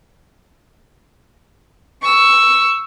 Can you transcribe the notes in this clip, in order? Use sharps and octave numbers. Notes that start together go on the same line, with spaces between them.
C#6 E6